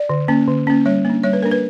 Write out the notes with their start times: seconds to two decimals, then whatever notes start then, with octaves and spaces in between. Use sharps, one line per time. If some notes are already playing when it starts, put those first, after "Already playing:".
Already playing: D5
0.09 D3
0.28 A#3 C#4
0.48 D3
0.67 A#3 C#4
0.86 G3 C#5
1.05 A#3 D4
1.23 G3 C#5
1.33 B4
1.43 A#3 D4 A#4
1.51 B4